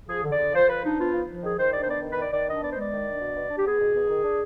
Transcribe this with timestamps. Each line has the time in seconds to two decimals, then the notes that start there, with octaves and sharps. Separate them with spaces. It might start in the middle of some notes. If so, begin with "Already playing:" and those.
0.08 F3 G#4
0.24 D3
0.31 D5
0.39 D3
0.54 F3 C5
0.68 F3 B4
0.83 D4 D#4
0.98 B3 F4
1.12 F3
1.28 F3
1.43 D#3 G#4
1.57 D#3 C5
1.72 D4 D5
1.81 C5
1.87 B3 D5
2.02 D#3
2.10 B4
2.17 D#3 D5
2.31 D#3 D5
2.47 D4 D#5
2.62 B3 D5
2.70 C5
2.76 G#3 D5
2.92 D#3
3.07 D4
3.21 B2
3.36 B2
3.50 D4
3.57 G4
3.66 B3 G#4
3.80 B2
3.96 B2
4.10 D#3
4.24 D4